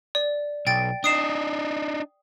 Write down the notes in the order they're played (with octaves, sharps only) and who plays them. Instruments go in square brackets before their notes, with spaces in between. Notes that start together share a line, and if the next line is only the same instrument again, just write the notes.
[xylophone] D5
[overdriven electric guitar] B1 [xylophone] G5 A6 D7
[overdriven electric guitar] D4 D#4 [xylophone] D#6 C7 E7